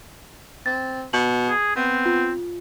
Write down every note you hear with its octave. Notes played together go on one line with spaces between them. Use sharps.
C4 A6
B2 F#7
G#4
B3 C4
F4